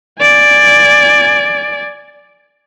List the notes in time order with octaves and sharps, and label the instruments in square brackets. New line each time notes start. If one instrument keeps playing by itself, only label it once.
[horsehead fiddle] D5 G#5